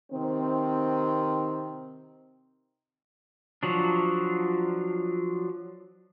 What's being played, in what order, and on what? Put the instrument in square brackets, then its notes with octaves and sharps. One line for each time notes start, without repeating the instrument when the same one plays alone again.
[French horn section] C3 D#3 C4
[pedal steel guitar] F3 F#3 D4